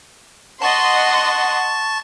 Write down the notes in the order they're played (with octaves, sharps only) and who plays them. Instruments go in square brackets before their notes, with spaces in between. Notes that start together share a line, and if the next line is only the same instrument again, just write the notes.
[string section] D#5 F#5 C6 [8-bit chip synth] A5 C#6 A6